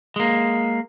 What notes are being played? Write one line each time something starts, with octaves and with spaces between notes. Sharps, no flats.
G#3 A#3